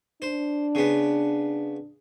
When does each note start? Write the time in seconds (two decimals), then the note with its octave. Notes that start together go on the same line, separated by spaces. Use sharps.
0.22 D4 C5
0.75 C#3 B3